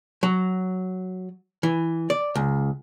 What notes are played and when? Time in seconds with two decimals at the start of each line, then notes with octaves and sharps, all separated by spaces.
0.23 F#3
1.63 E3
2.10 D5
2.36 C#2